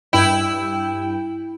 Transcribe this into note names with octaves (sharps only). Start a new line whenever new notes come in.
G2 E4 G5